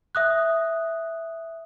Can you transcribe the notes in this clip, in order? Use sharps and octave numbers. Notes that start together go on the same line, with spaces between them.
E5 D#6 F#6